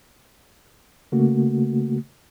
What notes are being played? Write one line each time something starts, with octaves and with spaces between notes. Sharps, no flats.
C#3 A3 A#3 F#4